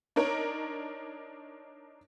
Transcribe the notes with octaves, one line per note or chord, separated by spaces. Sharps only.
D4 D#4 A#4 C#5